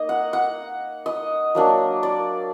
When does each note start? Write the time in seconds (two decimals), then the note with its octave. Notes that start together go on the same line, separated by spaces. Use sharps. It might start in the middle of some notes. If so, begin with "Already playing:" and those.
Already playing: A#3 D#4 D#5
0.09 F#5
0.33 F#5
1.06 D#5
1.55 F#3 A#3 D4
2.03 D5